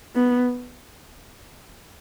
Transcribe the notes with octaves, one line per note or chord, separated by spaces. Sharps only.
B3